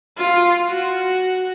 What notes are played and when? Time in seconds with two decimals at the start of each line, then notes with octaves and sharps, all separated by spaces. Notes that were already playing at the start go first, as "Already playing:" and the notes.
0.18 F4
0.69 F#4